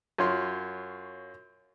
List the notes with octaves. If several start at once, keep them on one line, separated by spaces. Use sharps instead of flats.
F#2 F4 C#5 C6